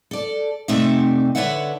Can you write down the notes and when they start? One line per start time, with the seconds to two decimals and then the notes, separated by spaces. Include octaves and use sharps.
0.11 A4 D5
0.68 C3 A3 C4 D#4 D5 E5
1.35 D3 B4 C#5 D5 E5 F#5